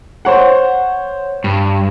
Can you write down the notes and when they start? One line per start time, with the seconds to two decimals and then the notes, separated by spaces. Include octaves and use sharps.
0.25 C5 C#5 F#5
1.44 G2